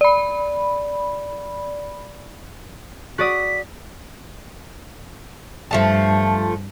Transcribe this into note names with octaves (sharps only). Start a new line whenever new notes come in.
D5 B5
F#4 D5 D#6 B6
G2 F3 A3 A5